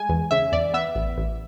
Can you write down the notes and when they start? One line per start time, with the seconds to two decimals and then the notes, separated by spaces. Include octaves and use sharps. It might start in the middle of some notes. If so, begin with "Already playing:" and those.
Already playing: G#3 G#5
0.09 E2
0.31 C#3 E5
0.52 E2 D5
0.74 B3 E5
0.95 A1
1.18 A1